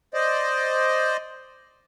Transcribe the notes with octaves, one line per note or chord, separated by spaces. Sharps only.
C5 D5 D#5